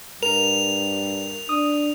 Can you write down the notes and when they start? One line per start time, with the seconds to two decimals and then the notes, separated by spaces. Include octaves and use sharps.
0.23 G2 A#4 F7
1.49 D4 D#6